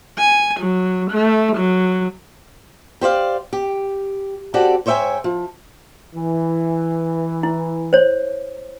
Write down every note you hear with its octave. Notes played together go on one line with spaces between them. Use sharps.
G#5
F#3
A3
F#3
G4 C5 D5 F5
G4
C4 F#4 G4 A4 D5 F#5
G#2 C5 C#5 E5 G5 G#5
F3
E3
E4
C5 C#5